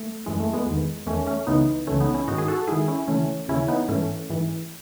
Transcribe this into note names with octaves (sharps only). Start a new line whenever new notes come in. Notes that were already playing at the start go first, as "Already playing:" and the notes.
Already playing: A3
F#2 E3 G#3
A3
G#3 B3
E2 D#3
E2 D#3 A3 C#4
A3 C#4
C#2 C#3 E3 B3 D#4
C#2 C#3 E3 A3 C#4
B3 D#4
C#4 E4
G#2 D#3 D#4 F#4
G#4
F#4 A4
G#2 D#3 E4 G#4
C#4 E4
D#2 C#3 E3 A3 C#4
D#2 C#3 E3 C#4 E4
B3 D#4
G#2 E3 A3 C#4
G#2 E3